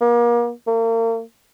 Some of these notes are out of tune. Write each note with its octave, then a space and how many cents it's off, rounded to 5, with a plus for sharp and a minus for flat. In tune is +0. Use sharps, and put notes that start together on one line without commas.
A#3 +35
A#3 -35